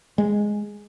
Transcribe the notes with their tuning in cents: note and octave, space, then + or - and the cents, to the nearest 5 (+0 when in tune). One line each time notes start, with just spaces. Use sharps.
G#3 +0